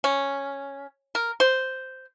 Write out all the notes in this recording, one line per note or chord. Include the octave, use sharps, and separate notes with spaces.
C#4
A#4
C5